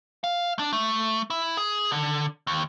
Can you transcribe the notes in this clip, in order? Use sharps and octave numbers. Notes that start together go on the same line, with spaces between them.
F5
D4
A3
E4
G#4
D3
D#2